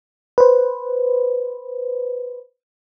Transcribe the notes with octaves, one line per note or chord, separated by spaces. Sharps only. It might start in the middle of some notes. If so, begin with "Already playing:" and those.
B4 C5